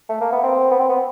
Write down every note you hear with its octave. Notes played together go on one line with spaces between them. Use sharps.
A3
A#3
B3
C4
B3
C4
B3